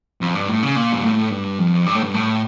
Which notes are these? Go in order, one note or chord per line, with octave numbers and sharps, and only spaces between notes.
F2
G2
A2
C#3
A#2
G2
A2
G2
F2
G2
A2
G2
A2